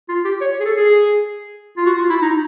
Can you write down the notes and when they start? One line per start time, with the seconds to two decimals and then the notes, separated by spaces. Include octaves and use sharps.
0.09 F4
0.25 G4
0.41 C#5
0.61 G#4
0.65 A4
0.77 G#4
1.78 F4
1.86 F#4
1.98 F4
2.10 E4
2.22 D#4